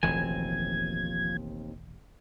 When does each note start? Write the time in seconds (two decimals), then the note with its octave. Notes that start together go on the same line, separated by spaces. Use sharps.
0.03 E1 A1 D#2 D#3 F3 C4 G#5 G#6